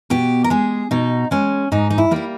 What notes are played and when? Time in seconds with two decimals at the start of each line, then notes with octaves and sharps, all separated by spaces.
0.10 B2 G4
0.44 A#4
0.50 G#3 G#4
0.91 B2 D#4
1.31 G#3 C#4
1.72 G#2 D#4
1.90 D#4
1.98 E4
2.11 G3 A#3 E4